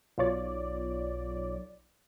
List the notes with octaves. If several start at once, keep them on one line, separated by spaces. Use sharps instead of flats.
B1 F4 C#5 D5